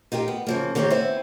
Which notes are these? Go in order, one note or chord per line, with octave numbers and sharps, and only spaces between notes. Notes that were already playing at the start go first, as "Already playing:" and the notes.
D#4 F4 G4 A#4
B3
C#3 F3 A#3
D#3 A#3 C4 G4 G#4 C#5
B3 C4 E4